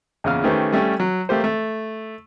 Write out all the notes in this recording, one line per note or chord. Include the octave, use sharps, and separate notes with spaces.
E2 A#2 C#3 F5 F6
D#3 A3 C#4 G4 B4 C5
G3 A3 C#4 G4
F#3
A3 A#3 G4 C5
A3